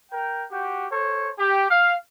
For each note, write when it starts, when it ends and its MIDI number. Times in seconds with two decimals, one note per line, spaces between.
0.11 0.44 70
0.11 0.44 79
0.50 0.86 66
0.50 0.86 67
0.90 1.29 69
0.90 1.29 72
0.90 1.29 73
1.38 1.69 67
1.69 1.95 77